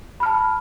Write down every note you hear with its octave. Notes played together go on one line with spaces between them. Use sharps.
A5 B5 F6